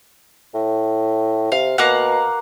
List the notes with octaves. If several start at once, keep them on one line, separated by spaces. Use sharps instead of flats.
A2
C3 F5
B2 A#3 F5 F#5